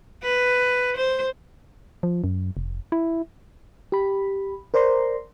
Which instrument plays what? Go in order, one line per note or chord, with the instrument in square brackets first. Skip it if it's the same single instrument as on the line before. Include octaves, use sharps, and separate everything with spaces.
[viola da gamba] B4
C5
[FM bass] F3
F#2
F1
E4
[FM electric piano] G4 B5
A#4 C5 D5 A#5 C6